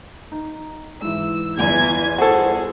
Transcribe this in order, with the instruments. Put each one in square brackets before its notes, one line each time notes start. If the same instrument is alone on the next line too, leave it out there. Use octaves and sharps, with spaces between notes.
[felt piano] D#4
[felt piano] G#2 E3 [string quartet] E6
[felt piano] G1 E2 [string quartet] E3 G#5 G#6
[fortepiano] F#4 A4 [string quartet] G#4 [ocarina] C5